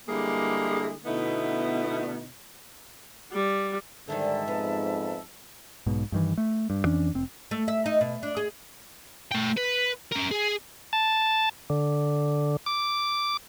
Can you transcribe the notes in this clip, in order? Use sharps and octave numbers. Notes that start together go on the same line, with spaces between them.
D3 G3 G#3 A#3 E4 G#4
B2 D3 A3 B3 D#4 E4
G3
G#2 D3 D#3 G3 E5 A5 E6
F2 B3
B1 G#2 B2
G2 D#3 E3
A3
G2
F2 E3 C#4 D4
F1 C4
A3
E5
D#4
B2
D4
G#4
A3 G5
B4
C#4 A#4
G#4
A5
D3
D6